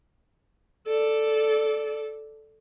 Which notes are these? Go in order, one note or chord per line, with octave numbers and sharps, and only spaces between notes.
A4 D5